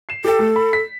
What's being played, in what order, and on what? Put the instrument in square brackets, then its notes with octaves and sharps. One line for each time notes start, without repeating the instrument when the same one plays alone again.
[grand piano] C7 E7
[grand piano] G4 G5 [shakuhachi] A4
[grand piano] A3
B5
B6